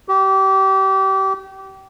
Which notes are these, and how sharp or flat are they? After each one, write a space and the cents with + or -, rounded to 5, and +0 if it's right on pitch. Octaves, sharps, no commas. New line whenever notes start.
G4 -30